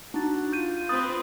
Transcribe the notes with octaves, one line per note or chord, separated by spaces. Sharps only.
D4 D#4 F#4 A6
F4 G6 D#7
C4 B4 D#6 A6